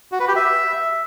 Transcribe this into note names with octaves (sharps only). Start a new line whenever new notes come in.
F#4
B4
G4
E5